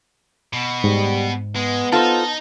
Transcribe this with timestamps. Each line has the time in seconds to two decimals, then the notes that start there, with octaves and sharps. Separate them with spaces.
0.53 B2
0.84 G#2 G3
1.56 G#3 B3
1.93 D#4 F4 A4 C5 A5